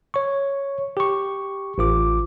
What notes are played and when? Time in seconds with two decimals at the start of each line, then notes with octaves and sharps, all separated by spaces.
0.14 C#5 C#6
0.97 G4 C#6
1.78 A1 F4 D6